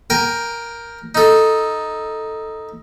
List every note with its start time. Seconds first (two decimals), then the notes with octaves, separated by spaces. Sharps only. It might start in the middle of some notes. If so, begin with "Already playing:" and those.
0.10 A#4 G5 G#5
1.15 D#4 A4